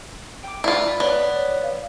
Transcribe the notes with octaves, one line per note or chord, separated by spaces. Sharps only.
G5 D6
E4 F4 D5 F5 B5
B3 C#5 D5
F5